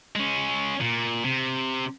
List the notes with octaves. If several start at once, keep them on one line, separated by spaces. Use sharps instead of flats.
G#3 C#4
A#2
C3